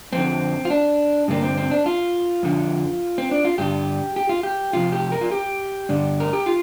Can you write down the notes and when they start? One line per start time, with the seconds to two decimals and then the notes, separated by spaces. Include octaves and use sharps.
0.13 F2 D3 C4
0.65 F4
0.70 D4
1.28 G2 D3 A#3
1.42 C4
1.57 C4
1.71 D4
1.86 F4
2.43 F2 D3
3.18 C4
3.31 D4
3.45 F4
3.58 G2 D3 G4
4.16 G4
4.29 F4
4.43 G4
4.73 F2 C3 F4
4.92 G4
5.12 A#4
5.21 F4
5.31 G4
5.89 G2 D3
6.20 A#4
6.33 G4
6.46 F4